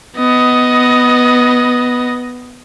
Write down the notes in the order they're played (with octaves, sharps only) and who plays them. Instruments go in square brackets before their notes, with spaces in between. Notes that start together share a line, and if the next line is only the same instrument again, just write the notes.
[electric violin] B3 D#5